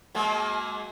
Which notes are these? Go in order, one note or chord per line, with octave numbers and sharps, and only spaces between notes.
F#3 G#3 A#3